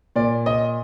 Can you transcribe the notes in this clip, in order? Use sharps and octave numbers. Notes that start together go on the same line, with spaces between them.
A#2 D5
D#5